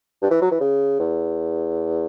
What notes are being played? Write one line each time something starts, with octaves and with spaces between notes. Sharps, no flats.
G2
E3
F#3
E3
C#3
E2